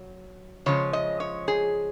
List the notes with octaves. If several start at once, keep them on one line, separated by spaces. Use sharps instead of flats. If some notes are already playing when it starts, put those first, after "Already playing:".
Already playing: F#3
C#3 F3 G#3 C#5
D#5
C#5
G#4